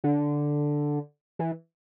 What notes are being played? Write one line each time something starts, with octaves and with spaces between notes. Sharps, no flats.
D3
E3